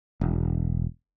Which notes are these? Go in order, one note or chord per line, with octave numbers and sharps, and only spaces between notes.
E1